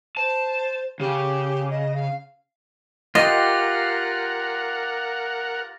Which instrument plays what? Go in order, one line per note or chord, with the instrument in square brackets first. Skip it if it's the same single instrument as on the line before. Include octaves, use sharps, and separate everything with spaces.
[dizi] C5 [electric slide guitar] A5
[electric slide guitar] C#3 [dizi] G4
[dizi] D#5
F5
[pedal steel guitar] F4 G4 [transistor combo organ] A#4 F#5 [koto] D#5 [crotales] A6 A#6